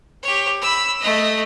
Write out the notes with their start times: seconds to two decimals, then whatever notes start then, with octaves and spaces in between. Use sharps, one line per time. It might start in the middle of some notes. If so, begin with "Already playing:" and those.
0.23 G4 C#5
0.62 B5 E6
1.00 A3 D#5